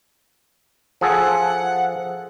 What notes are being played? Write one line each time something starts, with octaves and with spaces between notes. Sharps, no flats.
F3 G#4 A4 F#5